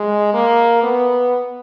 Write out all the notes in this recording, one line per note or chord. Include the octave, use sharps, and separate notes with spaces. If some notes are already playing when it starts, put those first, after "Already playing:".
Already playing: G#3
A#3
B3